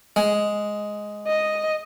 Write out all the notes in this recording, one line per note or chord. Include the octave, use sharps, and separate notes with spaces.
G#3
D#5